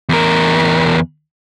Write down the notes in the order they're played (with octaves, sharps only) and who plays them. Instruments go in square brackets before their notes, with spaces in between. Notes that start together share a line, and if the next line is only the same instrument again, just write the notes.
[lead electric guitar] E2 A#4